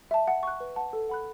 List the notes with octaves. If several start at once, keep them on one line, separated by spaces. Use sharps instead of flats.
E5 A5
F#5
C#6 F#6
B4
F#5 A5
A4
F#5 B5 F#6